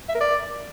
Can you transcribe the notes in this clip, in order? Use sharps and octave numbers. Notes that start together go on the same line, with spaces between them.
E5
A#4
D5